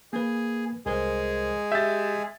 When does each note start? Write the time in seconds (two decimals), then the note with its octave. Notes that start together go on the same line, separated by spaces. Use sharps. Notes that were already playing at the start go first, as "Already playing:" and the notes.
0.13 A#3 G#4 B4
0.86 C2 G#3 G#4 A#4 C5
1.72 G4 E5 G6 A6